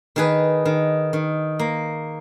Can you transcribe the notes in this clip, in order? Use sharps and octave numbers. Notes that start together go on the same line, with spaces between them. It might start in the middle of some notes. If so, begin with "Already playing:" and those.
D#3 G#4 B4
D#3
D#3
A#3